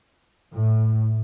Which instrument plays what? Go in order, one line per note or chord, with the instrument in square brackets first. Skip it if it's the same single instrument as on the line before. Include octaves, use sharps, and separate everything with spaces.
[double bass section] A2